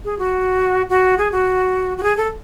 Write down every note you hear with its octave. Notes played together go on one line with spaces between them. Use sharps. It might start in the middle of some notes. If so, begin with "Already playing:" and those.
G#4
F#4
F#4
G#4
F#4
F#4
G#4
A4